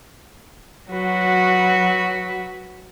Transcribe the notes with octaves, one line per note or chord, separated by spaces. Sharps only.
F#3 F#4 B4